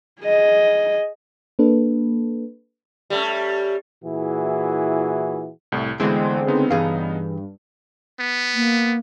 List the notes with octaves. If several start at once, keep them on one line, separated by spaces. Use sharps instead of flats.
G#4 D#5
A#3 D4 A4 B4
G3 A3 C#4
A#2 E3 E4 F#4 G#4
C2 A2
D2 D3 E3 G#3 B3 C4 G#4
C#3 B3 D#4
G2 E3 G#4 F5
B3
A#3